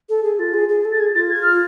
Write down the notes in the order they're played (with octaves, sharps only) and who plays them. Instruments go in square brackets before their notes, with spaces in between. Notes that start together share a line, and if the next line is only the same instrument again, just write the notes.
[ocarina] A4
G#4
[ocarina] F4 [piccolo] A6
[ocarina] G#4
G#4
A4
[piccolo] A6
[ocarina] G#4 [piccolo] G#6
[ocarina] F4 [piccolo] A6
[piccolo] G#6
F6